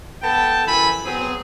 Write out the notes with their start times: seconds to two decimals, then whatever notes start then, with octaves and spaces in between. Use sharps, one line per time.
0.23 B3 A4 G5 A5
0.66 F#2 E3 A4 G#5 B5
1.05 F#3 B3 C4 G#4